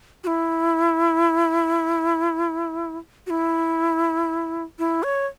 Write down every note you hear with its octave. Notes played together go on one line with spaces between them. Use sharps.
F#4
E4
F#4
E4
E4
C#5